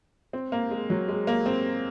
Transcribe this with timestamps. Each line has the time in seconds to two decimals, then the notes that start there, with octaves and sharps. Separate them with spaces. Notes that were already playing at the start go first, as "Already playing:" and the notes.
0.33 C4
0.52 A#3
0.71 G#3
0.90 F#3
1.08 G#3
1.27 A#3
1.46 C4